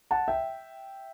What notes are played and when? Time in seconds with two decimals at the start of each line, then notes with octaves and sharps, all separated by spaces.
0.11 F#5 A5
0.28 E5 G5